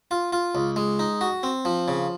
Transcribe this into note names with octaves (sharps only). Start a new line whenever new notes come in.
F4
F4
C#2
G#3
D#4
F#4
C4
F3
C#3